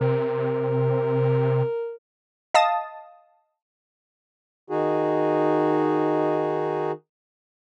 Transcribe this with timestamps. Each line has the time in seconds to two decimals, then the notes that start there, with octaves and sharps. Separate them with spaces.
0.01 C3 A#4
2.54 D#5 F5 A5 D#6 A6
4.68 D#3 D#4 F#4 G#4